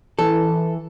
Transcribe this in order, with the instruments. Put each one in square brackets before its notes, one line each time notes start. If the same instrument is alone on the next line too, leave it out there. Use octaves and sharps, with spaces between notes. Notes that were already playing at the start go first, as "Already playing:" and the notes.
[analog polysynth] E3 [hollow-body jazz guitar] A4